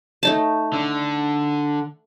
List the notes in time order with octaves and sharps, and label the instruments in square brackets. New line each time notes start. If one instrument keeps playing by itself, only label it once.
[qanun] A3 D#4 A5
[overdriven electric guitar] D3